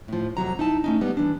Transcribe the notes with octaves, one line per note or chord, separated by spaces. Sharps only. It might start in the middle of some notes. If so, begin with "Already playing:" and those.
A2 F3
F2 C3 F#3 A#5
D#4 E4 A5
A3 C#4 D#4
G3 B3
E3 D4